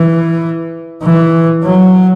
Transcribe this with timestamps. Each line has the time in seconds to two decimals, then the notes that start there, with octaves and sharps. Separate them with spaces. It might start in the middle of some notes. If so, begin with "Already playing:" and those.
Already playing: E3
1.03 E3
1.64 F#3